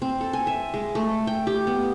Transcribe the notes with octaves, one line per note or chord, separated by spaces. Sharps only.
C4
A4
G#5
E5
G#3
A3
G5
G4
B3